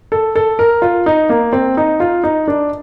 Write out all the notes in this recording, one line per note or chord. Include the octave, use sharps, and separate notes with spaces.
A4
A4
A#4
F4
D#4
A#3
C4
D#4
F4
D#4
D4